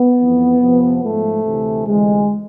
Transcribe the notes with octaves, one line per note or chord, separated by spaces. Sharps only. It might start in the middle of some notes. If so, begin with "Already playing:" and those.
Already playing: B3
F2 E3
F2 C3 F3
G#2 F3 A3
D2 C3 E3
D2 C3 E3 G#3